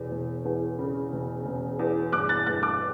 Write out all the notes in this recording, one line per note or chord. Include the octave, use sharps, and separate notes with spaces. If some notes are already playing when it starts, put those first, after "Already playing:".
Already playing: E1 E2
E1
E2
C#3
E1
E1
E2
G1 D6 F#6
F#6 A6
G1 F#6 A6
D6 F#6